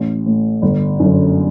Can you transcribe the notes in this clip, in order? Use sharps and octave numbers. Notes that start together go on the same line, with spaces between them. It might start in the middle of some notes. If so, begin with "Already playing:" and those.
Already playing: A1
A2
G1
F#2 D3